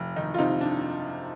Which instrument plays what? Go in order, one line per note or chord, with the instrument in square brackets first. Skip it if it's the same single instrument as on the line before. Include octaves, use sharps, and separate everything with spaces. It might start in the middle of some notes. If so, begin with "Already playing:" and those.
Already playing: [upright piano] F1
D#3 D#4
F4
C3 D#4
D4